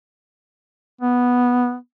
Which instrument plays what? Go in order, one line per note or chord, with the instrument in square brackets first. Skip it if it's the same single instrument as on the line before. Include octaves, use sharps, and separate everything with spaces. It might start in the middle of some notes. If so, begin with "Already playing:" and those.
[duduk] B3